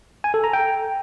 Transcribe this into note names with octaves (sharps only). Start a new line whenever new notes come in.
G#5
A4
A#5
G5